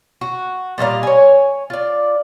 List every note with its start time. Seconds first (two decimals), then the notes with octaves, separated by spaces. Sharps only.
0.21 F#4
0.78 A#2 G3 D#5 F5
1.03 C#5 G#5
1.70 F4 D5